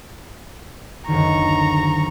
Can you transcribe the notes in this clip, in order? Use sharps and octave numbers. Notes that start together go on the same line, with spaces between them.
F#1 D2 D#3 A#5 C#6